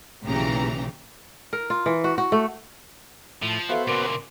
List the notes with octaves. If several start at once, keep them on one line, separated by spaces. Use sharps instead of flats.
B1 A#2 C#3 E3 G4 A#5
A#4
F4
E3
F#4
F#4
A3
A2 F3
B3 F#4 A4 C5 E5 F5
A#2 C#3 A#4 C6 D6